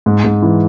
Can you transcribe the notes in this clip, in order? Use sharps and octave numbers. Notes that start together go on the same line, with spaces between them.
G#2
G#2
E3